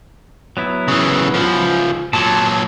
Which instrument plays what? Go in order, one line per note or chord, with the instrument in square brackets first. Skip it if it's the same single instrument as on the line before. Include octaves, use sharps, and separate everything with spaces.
[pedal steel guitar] F#3 B3 E4
[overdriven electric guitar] C#3 E3
C#2 F3
[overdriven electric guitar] A#2 F#3 [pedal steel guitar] A5